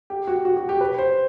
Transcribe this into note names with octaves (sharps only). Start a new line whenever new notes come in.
G4
F#4
F#4
F#4
G4
B4
C5